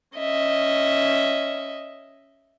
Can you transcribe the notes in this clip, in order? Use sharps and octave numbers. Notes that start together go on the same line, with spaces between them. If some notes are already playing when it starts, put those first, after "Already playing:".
C#4 D#5 E5